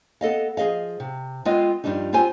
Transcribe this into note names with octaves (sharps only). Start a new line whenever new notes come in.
B3 A4 D#5 F5
F3 G#4 D#5 F5
C3
G#3 B3 C4 F4 B4 D#5
G2 F3 G3 D4 D#4
C4 F4 G4 C5 G#5